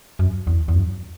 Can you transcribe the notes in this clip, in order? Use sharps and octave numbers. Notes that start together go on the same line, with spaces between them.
F#2
E2
E2
F#2